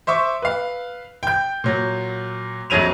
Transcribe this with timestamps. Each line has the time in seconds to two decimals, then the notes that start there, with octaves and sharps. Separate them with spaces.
0.07 C5 E5 C#6 D6
0.42 B4 F5
1.23 G5 G6
1.64 A#2 F#3
2.70 A#1 F2 F#3 D#7 F7